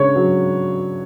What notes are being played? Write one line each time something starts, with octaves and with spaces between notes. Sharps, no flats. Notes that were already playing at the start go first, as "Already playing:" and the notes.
Already playing: C#3 D4 C#5
F#3